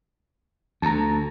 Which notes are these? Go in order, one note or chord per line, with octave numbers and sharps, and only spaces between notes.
D2 A5 A#5